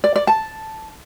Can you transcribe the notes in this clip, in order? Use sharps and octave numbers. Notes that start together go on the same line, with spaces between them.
D5
D5
A5